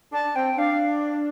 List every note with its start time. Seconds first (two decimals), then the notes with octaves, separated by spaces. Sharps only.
0.12 D4 A5
0.35 C4 G5
0.58 D4 F5